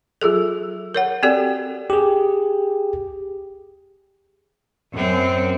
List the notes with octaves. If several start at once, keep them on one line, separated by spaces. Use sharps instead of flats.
F#3 F4 G#4 A4
A#4 C#5 F#5
C4 F#4 G4 A4 D5 G5
G4 G#4
F#2 C4